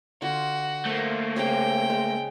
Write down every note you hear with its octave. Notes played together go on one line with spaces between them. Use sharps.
D3 F4 F#4
A3 A#3 C5
C#3 C4 G4 G5
G#3